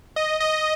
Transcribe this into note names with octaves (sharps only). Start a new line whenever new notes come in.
D#5
D#5